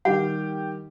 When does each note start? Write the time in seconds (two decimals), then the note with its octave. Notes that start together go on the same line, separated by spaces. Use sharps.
0.05 D#3 G3 G4 F#5